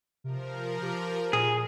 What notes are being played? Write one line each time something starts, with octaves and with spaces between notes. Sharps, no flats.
C3 F3 A#4
G4
A#2 G#4